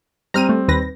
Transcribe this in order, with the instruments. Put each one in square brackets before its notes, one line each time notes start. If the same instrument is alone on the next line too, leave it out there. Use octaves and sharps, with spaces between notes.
[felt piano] G3 C4 [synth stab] A#5 F6 D#7
[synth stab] A3
D#2 B4 A#6